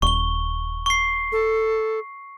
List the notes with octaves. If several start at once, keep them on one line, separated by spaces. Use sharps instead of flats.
D#1 C#6 G7
C#6 C7
A4